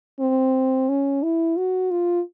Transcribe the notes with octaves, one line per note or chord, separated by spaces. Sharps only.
C4
C#4
E4
F#4
F4